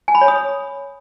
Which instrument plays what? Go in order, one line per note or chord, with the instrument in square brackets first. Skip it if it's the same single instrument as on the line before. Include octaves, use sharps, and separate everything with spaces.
[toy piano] G#5
B5
C#5
D#6